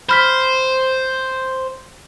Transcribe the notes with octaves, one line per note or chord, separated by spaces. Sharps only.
C5 B5 F6 B6